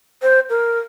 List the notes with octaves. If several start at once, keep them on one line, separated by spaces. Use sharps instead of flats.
C5
A#4